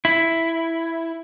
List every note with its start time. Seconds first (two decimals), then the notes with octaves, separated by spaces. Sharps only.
0.05 E4